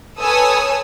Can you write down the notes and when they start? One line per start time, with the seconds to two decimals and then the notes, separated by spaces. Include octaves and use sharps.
0.20 A4 B4 C#5 G#5 D#6 E6